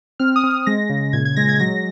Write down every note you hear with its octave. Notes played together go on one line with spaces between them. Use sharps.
C4 F6
D#6
C4
D#6
G#3 A#6
C#3
A#2 G#6
G#6
G#3 A#6
G#6
F#3 A#6